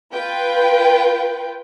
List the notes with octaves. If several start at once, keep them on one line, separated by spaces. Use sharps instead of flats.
F4 B4 G5